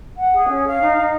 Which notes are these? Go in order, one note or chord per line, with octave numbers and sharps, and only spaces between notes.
F#5
G#4
C#4
F5
D#4
D#4